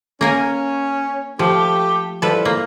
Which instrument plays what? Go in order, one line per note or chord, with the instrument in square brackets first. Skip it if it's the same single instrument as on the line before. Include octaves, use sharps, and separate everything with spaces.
[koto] A#3 A#4 G#5 [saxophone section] C#4
[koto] F3 [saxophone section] A3 G4
[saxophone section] F3 G3 E4 [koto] A4 B4
[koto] A#3